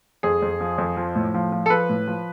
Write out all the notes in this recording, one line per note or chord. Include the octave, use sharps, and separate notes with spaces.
F2 G#4
F2
F3
F2
F3
A2
F3
F3
A4
F3 B4
A2
F3